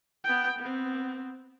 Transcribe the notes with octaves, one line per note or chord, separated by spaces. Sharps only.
B3 G5
B3 C4